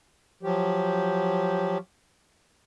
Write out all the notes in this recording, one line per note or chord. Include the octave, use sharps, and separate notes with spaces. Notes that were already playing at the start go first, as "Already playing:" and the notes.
F3 F#3 G4